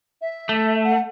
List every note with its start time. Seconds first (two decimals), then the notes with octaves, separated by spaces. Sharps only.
0.21 E5
0.49 A3
0.84 F#5